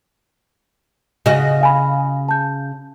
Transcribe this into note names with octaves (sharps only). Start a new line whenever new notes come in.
C#3 F#4 D#5
F5 G#5 B5
A5 G6